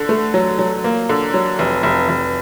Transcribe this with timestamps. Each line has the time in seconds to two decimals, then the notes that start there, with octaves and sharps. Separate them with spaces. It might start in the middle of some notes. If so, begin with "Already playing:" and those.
Already playing: D3
0.09 A3
0.34 F#3
0.59 F#3
0.84 A#3
1.09 D3
1.34 F#3
1.59 F1
1.83 F1
2.09 F1